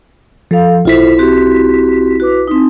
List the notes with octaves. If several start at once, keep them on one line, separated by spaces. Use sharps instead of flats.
F3 A4 F5
B1 E4 F4 A4 C5 B6
C4 F#4 G4
F#4 B4 D6
C4 D#4